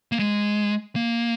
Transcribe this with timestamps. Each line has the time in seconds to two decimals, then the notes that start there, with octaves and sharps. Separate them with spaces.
0.12 A#3
0.19 G#3
0.96 A#3